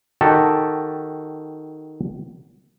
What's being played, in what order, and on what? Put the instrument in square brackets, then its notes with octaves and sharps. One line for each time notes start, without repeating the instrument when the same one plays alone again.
[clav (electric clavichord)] D#3 F#4 G4 A4 A5